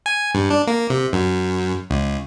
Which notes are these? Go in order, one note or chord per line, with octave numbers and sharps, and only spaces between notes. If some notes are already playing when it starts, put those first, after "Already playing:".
G#5
G2
D4
A#3
C3
F#2
C#2